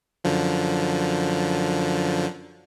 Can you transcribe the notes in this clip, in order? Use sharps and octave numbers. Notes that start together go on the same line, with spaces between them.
F#2 D3 F3